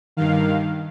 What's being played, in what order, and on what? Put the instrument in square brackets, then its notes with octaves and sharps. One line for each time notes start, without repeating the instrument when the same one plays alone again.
[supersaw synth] G2 D#3 F5